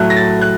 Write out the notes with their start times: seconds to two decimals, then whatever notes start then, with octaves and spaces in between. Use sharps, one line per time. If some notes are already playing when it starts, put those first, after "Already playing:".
Already playing: A2 F#3 A3 F#6
0.10 A#6
0.16 A6
0.41 F#6